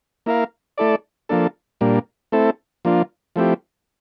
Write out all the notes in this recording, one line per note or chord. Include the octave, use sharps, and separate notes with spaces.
A#3 E4 A#4 F5
A3 E4 A4 D5
F3 A#3 D4 A4
A#2 G3 A#3 D4
A3 C4 E4 A4
F3 A#3 D4 F4
F3 A3 C4 E4 G4